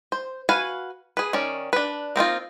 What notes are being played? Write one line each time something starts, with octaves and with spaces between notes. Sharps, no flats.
C5
F#4 B4 F5 G#5
G#4 B4
D#3 C#4 D5
D4 B4
A#3 C4 D#4 F4